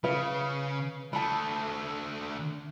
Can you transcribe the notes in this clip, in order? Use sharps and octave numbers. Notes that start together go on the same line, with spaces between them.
C#3 B4 F5
D3 A3 A5 B5